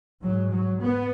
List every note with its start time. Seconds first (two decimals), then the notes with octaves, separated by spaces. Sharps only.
0.23 G#2 F#3
0.51 F#3
0.80 B3